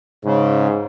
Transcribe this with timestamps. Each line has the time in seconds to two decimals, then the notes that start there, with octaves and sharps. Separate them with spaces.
0.25 G#2 C#3